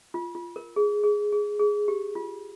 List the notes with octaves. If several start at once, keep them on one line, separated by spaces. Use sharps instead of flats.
F4
F4
A#4
G#4
G#4
G#4
G#4
G4
F4